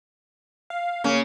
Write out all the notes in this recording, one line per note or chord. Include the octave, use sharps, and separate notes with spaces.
F5
C#3 A#3 C#4